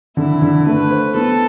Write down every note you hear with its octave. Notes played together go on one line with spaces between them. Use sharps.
D3 E4
D3
A3 B4
C5
B3 A4